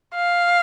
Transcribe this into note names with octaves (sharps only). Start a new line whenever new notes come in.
F5